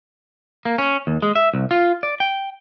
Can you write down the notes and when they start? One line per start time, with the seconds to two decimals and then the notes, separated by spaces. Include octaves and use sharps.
0.65 A#3
0.78 C#4
1.07 D#2
1.22 G#3
1.36 E5
1.54 C2
1.71 F4
2.03 D5
2.20 G5